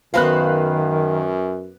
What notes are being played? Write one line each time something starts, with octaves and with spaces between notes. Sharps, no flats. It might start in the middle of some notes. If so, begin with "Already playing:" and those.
F#2 D#3 B3 F#4 C5 F5 B5 F#6